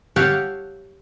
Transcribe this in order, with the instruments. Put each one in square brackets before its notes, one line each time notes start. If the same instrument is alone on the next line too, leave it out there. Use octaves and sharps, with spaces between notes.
[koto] G4 A4 C#5 F5 F#5